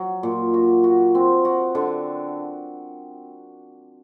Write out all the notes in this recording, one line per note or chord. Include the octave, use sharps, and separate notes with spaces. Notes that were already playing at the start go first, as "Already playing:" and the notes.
Already playing: F#3
A#2
F#4
F#4
C4
F#4
D3